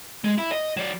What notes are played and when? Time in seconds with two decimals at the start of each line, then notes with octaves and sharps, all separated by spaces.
0.24 G#3
0.38 E4
0.52 D#5
0.77 F#3 D5